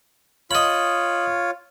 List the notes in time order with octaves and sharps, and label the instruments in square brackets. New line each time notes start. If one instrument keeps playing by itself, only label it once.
[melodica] F4 C#5 [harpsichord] D#5 B5